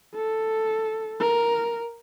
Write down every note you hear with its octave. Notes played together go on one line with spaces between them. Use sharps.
A4
A#4